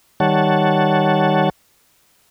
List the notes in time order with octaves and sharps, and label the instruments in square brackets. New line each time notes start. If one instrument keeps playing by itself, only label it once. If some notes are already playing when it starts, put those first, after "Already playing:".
[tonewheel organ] D#3 G3 C#5 F#5 A5